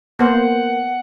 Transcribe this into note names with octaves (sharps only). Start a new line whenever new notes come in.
A#3 B3 C5 F#5